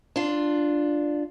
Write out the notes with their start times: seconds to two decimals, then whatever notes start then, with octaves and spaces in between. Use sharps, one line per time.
0.16 D4 F4